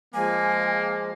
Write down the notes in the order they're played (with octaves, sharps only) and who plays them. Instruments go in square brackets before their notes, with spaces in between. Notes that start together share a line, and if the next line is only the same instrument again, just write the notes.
[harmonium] F3 G#3 [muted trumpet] A#3 [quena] G#5